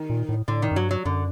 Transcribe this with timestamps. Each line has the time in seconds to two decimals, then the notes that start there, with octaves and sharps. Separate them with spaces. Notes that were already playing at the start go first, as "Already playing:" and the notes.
Already playing: D#3
0.10 A#2
0.29 A2
0.48 A2 D3
0.62 D#3
0.71 F#2
0.76 G2 F#3
0.91 F#3
1.05 F#2 D3